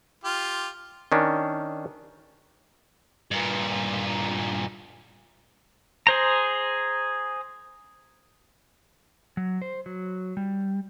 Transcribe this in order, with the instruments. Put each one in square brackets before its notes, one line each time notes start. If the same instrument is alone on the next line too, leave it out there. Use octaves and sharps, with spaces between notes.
[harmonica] F4 G4
[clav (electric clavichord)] D#3 C#4 D4
[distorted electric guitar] G2 A#2
[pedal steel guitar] G#4 C5 A#5
[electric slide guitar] F#3
C5
F#3
G3